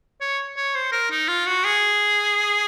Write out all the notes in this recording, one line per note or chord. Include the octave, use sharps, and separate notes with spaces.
C#5
C#5
C5
A#4
D#4
F4
F#4
G#4